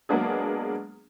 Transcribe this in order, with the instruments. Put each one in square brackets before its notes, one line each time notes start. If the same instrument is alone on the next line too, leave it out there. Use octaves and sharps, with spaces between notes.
[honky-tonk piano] F#3 G#3 A#3 B3 D4 G#4